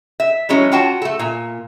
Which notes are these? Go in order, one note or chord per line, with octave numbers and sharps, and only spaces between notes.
E5
E3 F#3 G#3 C#4
C#4 F4 F#4 G5 A5
A3 A4
A#2 G#5